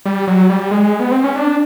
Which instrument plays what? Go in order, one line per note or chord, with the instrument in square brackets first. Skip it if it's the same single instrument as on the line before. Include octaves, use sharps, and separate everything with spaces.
[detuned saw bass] G3
F#3
G3
G#3
B3
C4
C#4
D4